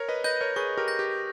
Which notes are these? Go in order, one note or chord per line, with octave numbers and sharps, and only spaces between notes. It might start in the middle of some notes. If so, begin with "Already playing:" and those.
Already playing: A#4 C#5
B4 D#5
B4 D#5 G6 A#6
A#4 C#5
G#4 B4 C#6
G4 A#4
G6 A#6
G4